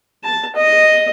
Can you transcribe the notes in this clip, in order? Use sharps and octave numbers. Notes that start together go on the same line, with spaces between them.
A5
D#5